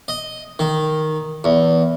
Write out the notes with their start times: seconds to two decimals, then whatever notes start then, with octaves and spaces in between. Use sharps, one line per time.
0.08 D#5
0.59 D#3
1.44 E2